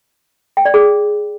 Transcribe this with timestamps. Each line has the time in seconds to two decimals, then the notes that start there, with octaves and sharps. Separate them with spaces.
0.57 G5
0.65 D5
0.74 G#4